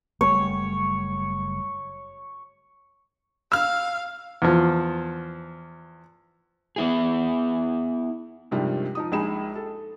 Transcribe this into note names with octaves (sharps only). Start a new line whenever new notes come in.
F#1 G3 A3 C#5
F5 E6 F6
E2 F3
B3 E4 G#4
G2 C3 D#3 F3 G3 G#3
F3 D#4 D#6
A#1 G#3 D#4 G#4 B5 E7
A4